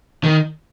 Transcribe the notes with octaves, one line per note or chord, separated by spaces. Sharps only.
D#3